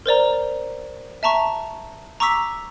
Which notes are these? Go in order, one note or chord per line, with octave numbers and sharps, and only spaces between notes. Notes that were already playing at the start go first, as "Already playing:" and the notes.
A#4 C5 D5 A#5
E5 A5 A#5 C#6
A#5 C#6 D6 E6 B6